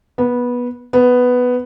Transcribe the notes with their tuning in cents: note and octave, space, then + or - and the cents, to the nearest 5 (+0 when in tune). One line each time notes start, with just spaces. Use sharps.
B3 -15
B3 +5